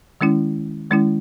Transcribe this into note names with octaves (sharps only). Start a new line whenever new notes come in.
D#3 G#3 C#4 E4
D#3 G#3 C#4 E4